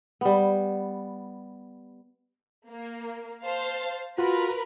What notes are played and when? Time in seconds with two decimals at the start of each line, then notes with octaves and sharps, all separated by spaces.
0.21 G3 B3
2.68 A#3
3.43 C5 F5 A5
4.18 F4 F#4 A#4 B4 B5